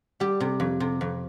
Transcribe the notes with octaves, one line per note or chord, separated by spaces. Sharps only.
G3 G4
C3
F2
C3
F2